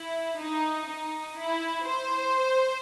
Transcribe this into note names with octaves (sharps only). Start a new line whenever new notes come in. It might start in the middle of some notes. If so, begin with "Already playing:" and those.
Already playing: E4
D#4
D#4
E4
C5